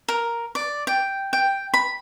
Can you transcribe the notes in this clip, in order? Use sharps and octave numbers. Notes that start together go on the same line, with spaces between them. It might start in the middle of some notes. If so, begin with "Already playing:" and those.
A#4
D5
G5
G5
B5